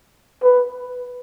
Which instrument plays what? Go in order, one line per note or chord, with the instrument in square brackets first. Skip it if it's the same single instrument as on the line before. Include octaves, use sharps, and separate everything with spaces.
[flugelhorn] B4